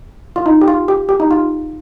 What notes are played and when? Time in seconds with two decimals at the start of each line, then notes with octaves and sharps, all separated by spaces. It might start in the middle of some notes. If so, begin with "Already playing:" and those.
0.36 F4
0.46 D#4
0.61 G4
0.68 F4
0.88 G4
1.09 G4
1.20 D#4
1.31 F4